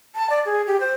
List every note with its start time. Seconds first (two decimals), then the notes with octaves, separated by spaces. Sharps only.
0.15 A5
0.30 D5
0.46 G#4
0.67 G4
0.80 C5